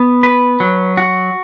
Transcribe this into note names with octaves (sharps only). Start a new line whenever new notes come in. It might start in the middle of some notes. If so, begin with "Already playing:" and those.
Already playing: B3
B4
F#3
F#4